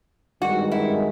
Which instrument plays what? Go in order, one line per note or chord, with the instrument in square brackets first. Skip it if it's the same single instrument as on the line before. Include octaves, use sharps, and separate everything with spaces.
[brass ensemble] G#1 G2 D#3 G#3 [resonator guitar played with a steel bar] F#4
[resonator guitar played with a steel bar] E4